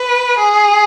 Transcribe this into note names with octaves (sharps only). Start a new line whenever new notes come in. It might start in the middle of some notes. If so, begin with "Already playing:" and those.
Already playing: B4
G#4